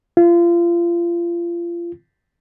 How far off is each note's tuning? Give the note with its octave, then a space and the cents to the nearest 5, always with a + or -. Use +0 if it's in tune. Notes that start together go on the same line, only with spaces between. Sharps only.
F4 -30